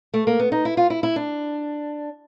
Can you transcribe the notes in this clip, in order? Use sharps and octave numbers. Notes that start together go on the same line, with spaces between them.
A3
A#3
B3
D#4
E4
F4
E4
E4
D4